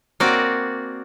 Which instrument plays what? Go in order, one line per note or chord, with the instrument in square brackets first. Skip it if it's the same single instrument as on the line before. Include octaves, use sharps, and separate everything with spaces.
[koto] A#3 C4 F#4 D5